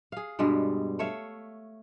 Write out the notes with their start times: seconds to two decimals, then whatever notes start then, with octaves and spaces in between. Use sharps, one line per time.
0.12 G#4 F5
0.39 G2 B2 G3 G#3
0.99 A3 C#5 E5 F5